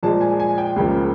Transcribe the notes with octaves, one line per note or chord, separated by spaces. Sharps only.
A#2 F3 G#3 A5
G#5
G#5
G5
C#2 C#3 F3 A#3